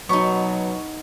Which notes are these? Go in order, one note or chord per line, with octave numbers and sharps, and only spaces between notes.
B2 F#3 B3 D#4 C#6